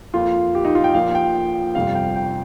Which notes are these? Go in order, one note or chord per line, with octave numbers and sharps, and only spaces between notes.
F2 F3 A#3 F4
G4
D#4
F4
G5
A#1 A#2 F3 A#3 F5
G5
G1 F2 C3 G3 F5
G5
G5